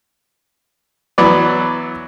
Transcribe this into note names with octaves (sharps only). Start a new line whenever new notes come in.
E3 F#3 B3 D5